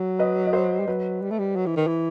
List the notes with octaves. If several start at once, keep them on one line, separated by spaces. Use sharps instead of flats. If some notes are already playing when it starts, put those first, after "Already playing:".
Already playing: F#3
B4 D#5
D#5
C5
G3
F#3 B4
G3
A3
G3
F#3
E3
D#3
E3